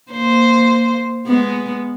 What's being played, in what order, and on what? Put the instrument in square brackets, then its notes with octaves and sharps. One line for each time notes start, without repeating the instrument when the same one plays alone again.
[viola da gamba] A#3 C5
G#3 B3